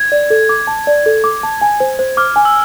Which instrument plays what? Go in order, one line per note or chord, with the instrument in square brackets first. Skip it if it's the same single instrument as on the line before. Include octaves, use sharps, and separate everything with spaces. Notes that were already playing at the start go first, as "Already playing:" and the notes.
Already playing: [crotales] G#6
[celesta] D5
A4
D6
A5
D5
A4
D6
A5
G#5
C5
C5
[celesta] D6 [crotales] F6
[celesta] G#5
[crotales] E6